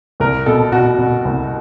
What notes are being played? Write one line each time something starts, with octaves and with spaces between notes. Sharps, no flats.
C2 A#4
B2 A4
B2 F#4
B2
C2